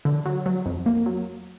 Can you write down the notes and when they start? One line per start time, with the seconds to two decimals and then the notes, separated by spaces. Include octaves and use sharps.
0.05 D3
0.26 F#3
0.46 F#3
0.66 F2
0.86 A#3
1.06 F#3